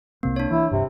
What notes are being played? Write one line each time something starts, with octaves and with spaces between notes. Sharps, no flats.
C2 C3 A#3 C4
D4 C#5
E3 E4
D1 G2 C3